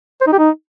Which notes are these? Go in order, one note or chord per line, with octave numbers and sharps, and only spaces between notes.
C5
D#4
G4
D#4